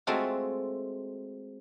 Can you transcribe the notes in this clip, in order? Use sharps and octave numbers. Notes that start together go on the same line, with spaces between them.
G#3 A3 C4 F4 F#4 A4